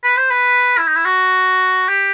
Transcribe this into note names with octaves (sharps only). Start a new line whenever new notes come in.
B4
C5
B4
E4
D#4
E4
F#4
G4